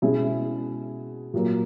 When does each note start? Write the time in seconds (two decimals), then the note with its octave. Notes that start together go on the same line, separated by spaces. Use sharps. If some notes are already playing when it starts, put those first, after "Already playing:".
0.02 B2 G#3 C#4 E4 G#4
1.34 A#2 F#3 A#3